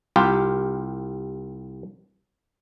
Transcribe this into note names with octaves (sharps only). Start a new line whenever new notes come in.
C2 F4 G4